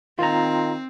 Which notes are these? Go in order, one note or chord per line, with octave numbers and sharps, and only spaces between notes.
D#3 C4 F4 A#5